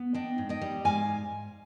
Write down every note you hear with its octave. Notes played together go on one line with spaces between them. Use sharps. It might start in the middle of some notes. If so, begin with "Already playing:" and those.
Already playing: B3
D4 D#5 G5
G#2
D#5 G5
G3
G#2 F5 G#5